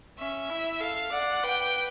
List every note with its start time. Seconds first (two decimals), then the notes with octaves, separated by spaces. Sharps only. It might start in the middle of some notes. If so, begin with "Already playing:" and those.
0.18 C#4 E5
0.49 E4
0.80 A4 F5
1.12 D5 F#5
1.43 B4 G5